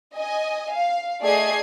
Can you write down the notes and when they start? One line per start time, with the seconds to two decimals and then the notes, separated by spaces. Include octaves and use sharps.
0.16 D#5 G#5
0.74 F5
1.23 A3 G#4 D5 D#5 G#6 C7